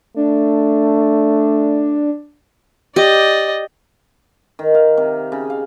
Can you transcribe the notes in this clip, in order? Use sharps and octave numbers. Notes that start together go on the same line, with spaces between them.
A3 D4
G4 D5 D#5
D#3
F5
C3
C#3
F5